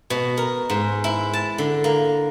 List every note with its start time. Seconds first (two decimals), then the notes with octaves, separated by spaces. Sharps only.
0.10 B2
0.37 A#4
0.70 G#2
1.04 E4
1.33 A5
1.58 D3
1.84 A#3